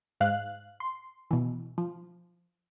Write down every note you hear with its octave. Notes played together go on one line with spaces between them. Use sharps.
G#2 F5 F#6
C6
B2 E3
F3